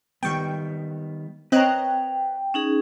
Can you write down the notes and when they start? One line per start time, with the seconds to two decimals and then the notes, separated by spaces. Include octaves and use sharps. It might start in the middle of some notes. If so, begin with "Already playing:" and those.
0.23 D#3 G3 B3 G5 C#6
1.52 C4 B4 C#5 D#5 G5 A#5 F#6
2.54 C#4 D#4 G#4